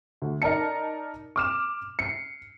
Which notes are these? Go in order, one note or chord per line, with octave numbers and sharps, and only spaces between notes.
D2
D#4 A#4 D5 A5 C#7
D6 F6 E7
C7 C#7